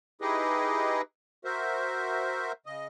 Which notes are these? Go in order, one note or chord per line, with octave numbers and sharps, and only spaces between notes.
D#4 E4 G4 G#4 B4 D#5
F#4 A#4 C5 E5
C#3 D#5